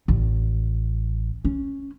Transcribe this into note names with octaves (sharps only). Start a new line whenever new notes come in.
A1
C#4